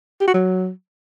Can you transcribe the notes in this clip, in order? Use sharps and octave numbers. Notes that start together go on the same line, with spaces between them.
G4
F#4
F#3